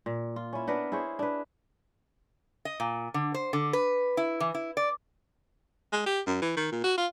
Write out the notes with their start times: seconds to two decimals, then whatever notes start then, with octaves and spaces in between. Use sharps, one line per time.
0.06 A#2
0.36 F4
0.53 C#4 E4
0.67 B3 D4 A#4 B4
0.92 E4 G#4 C5 C#5
1.19 D4 B4
2.65 D#5
2.80 A#2
3.14 D3
3.34 C5
3.53 D3
3.73 B4
4.17 E4
4.40 E3
4.54 E4
4.77 D5
5.93 G#3
6.06 G4
6.27 F#2
6.42 E3
6.56 D#3
6.72 A#2
6.84 F#4
6.98 F4